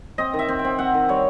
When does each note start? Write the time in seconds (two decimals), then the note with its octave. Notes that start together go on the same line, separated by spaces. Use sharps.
0.18 C4 D#5
0.34 D#3
0.39 E5
0.49 C4
0.59 G5
0.64 C4
0.79 C4 F#5
0.94 D#3
1.09 G3 C#5